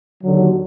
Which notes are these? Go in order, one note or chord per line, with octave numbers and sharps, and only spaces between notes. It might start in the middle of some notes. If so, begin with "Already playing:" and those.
D#2 D3 F#3